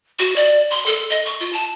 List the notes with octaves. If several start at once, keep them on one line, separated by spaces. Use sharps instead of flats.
F#4
D5
C6
A4
D#5
C#6
F4
A5